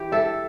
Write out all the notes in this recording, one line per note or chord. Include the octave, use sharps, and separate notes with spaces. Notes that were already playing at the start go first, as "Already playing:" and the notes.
Already playing: E3 G4
A4 E5